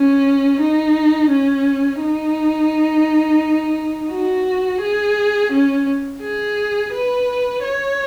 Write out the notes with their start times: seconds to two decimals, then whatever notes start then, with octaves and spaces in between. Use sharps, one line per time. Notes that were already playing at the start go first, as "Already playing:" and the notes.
Already playing: C#4
0.61 D#4
1.30 C#4
2.01 D#4
4.12 F#4
4.82 G#4
5.52 C#4
6.22 G#4
6.93 B4
7.63 C#5